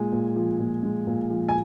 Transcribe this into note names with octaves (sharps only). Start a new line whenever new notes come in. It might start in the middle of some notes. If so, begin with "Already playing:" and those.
Already playing: A#2 G#3 G#5
A#2
F3
A#2
G#3
A#2
F3
G#5